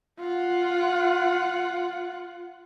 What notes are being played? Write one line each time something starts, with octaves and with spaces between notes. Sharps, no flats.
F4 F#5